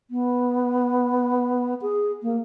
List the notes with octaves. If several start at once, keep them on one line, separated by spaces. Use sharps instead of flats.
B3
G#4
A#3